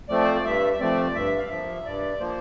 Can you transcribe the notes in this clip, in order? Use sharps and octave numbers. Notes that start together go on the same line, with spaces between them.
F3 A3 C4 D5
C5
D5
G2 E5
E5
F3 A3 C4 D5
G2 E5
F5
F3 A#3 E5
G2 D5
F3 A#3 C5